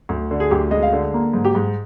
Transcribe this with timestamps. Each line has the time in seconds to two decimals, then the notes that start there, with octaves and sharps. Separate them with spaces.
0.09 D2
0.31 D3
0.40 G#4
0.51 D2 G4
0.71 G#3 D#5
0.82 F5
0.92 D3
1.14 A#3
1.33 G#2
1.45 G4
1.55 G#2